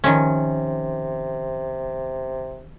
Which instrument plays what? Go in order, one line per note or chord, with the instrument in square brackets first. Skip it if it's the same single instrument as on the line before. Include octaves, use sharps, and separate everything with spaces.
[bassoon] C3 [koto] D#3 F3 C#4